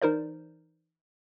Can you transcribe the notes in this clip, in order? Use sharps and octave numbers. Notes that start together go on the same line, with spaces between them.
E3 D#4 A#4 C5 D5